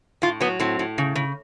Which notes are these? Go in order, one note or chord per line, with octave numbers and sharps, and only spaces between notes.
A2 F4
F#3 B3
A2 C4
A2
C#3
C#3